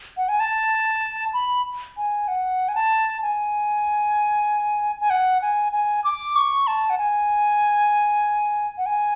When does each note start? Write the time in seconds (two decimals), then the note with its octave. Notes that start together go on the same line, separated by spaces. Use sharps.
0.17 F#5
0.29 G#5
0.40 A5
1.34 B5
1.97 G#5
2.28 F#5
2.69 G#5
2.75 A5
3.22 G#5
5.01 G#5
5.10 F#5
5.42 G#5
5.73 G#5
6.04 D6
6.36 C#6
6.67 A5
6.90 F#5
6.98 G#5
8.78 F#5
8.86 G#5